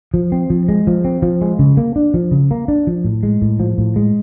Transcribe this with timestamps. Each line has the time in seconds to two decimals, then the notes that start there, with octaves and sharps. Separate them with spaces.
0.14 F3
0.32 C4
0.50 F3
0.69 G#3
0.87 F3
1.05 C4
1.22 F3
1.41 G#3
1.59 C#3
1.77 A#3
1.96 D4
2.14 F3
2.31 C#3
2.51 A#3
2.68 D4
2.87 F3
3.04 A2
3.23 G#3
3.42 A2
3.60 F3
3.78 A2
3.96 G#3